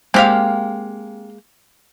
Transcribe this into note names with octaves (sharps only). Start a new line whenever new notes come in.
G#3 A#3 C4 G4 F5